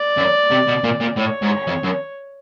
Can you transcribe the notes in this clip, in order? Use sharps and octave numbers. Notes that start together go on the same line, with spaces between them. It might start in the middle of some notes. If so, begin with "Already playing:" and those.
Already playing: D5
F#2
C3
B2
A#2
A#2
A2 C#5
G#2
F2
F#2